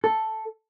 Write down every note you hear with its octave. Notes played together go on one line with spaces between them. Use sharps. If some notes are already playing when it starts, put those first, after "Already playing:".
A4